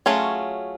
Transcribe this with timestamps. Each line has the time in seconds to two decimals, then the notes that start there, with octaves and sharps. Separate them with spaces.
0.06 F#3 A3 C#4 F4 G#4